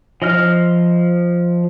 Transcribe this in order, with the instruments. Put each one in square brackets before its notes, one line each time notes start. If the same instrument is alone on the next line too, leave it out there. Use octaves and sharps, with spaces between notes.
[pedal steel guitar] F3 D#5 F6